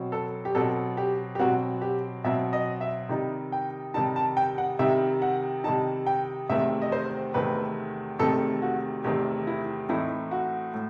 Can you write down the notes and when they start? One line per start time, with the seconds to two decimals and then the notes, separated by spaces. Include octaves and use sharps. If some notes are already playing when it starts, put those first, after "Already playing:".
Already playing: B2 F#3 C4
0.12 A4
0.45 G4
0.55 B2 F#3 C4 A4
0.97 G4
1.35 G4
1.39 B2 F#3 C4 F#4
1.81 G4
2.24 B2 F#3 C4 E5
2.53 D#5
2.81 E5
3.09 C3 D#3 G3 D#4
3.52 G5
3.94 C3 D#3 G3 D#4 A5
4.16 A5
4.37 G5
4.58 F#5
4.79 C3 D#3 G3 D#4 E5
5.22 F#5
5.64 C3 D#3 G3 D#4 A5
6.07 G5
6.49 E2 C3 D#3 A3 C4 E5
6.82 D#5
6.92 C5
7.34 E2 C3 D#3 A3 C4 B4
8.19 E2 C3 D#3 A3 C4 A4
8.62 F#4
9.04 E2 C3 D#3 A3 C4 G4
9.47 E4
9.89 A2 E3 A3 C4 D#4 E4
10.31 F#4
10.74 A2